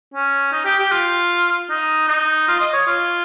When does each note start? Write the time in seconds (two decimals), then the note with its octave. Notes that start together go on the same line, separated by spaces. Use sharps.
0.14 C#4
0.53 D#4
0.65 G4
0.79 G4
0.92 F4
1.70 D#4
2.08 D#4
2.48 F4
2.60 D#5
2.73 C#5
2.87 F4